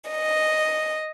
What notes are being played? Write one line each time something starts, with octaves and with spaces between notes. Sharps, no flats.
D#5